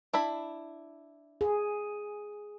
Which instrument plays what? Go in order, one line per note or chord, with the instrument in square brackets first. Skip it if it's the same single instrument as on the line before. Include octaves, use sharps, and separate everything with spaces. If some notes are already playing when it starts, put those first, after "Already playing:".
[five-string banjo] D4 E4 B5
[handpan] G#4